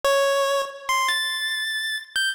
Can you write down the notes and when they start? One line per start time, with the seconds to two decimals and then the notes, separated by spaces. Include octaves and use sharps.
0.04 C#5
0.89 C6
1.08 A6
2.16 G6